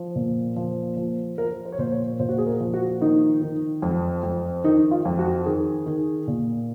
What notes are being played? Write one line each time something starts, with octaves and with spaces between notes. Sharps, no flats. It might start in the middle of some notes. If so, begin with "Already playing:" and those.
Already playing: F3
A#2
F3
F3
F3 A#4
C5
C#5
A#2 C5
C#5
A#2 C5
F#4
G#4
A#4
F3
F#4
D#3 D#4
D#3
F2
F2
D#3 D#4
F4
F2
F#4
D#3 G#4
D#3
A#2